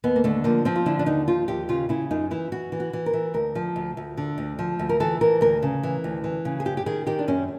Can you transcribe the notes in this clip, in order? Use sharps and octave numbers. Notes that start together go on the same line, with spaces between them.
D#2 B3
A#3
D3 A3
F3 A#3
F3 C4
F4
D3 E4
D4
D#2 D#4
F3 F4
D#2 G4
C#3 F4
C#3 E4
F#2 D#4
E3 E4
E3 F#4
E3
F#4
E3
A#4
E3
D2 A#4
F3
D2
D2
D3
D2
F3
D2
A#4
E3 A4
E3 A#4
D2 A#4
C#3
E3
D2
E3
C#3
G#4
F#2 G4
G4
D#3 G#4
D#3 G4
D4
F#2 C#4